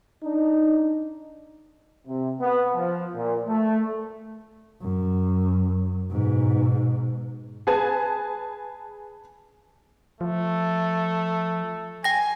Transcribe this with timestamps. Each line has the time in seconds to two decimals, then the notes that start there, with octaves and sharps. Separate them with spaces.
0.23 D4 D#4
2.07 C3
2.41 B3
2.73 F3
3.15 A#2
3.47 A3
4.82 F#2
6.11 G#2 B2
7.67 G#4 B4 G#5 A5
10.21 F3 A3
12.04 G5 G#5 A#6